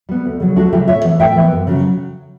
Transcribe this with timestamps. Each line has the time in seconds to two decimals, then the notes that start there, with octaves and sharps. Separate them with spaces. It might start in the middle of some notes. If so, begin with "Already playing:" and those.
0.09 G3 B3
0.25 D2
0.40 C#3 F#3
0.56 D2 D4 F#4
0.66 A4
0.72 C#3 F#3 E4 G4
0.88 A2 C#5 E5
1.05 E3 B3
1.19 A2 E5 G5
1.36 E3 B3
1.51 F#2
1.67 C#3 F#3